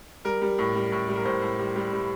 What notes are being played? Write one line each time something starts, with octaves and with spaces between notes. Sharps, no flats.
G3 A#4
G3
A2
G3
A2
G3
A#4
A2 C5
A2
G3
G3
G3